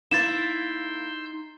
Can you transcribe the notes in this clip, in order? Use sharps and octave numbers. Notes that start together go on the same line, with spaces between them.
A#3 D#4 E4 C6 E6 G6 A6 E7